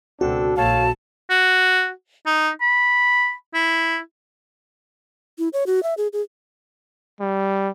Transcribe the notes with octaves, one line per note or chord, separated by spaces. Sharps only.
C#2 B2 C4 D4 F#4 A4
A#1 A#2 A4 C#5 F5 A5
F#4
D#4
B5
E4
E4
C#5
F#4
E5
G#4
G#4
G3